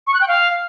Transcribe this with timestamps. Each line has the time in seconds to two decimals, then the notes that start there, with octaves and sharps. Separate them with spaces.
0.07 C#6
0.14 F#6
0.21 G5
0.28 F5